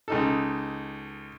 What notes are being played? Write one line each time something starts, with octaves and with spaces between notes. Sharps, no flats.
C#2 D#4 A4